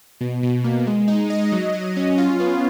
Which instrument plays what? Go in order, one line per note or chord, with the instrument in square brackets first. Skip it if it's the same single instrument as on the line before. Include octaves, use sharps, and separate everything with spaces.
[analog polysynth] B2
B2
A#3
G#3
D#4
D#5
F#3
F#3
C#4
F4
B3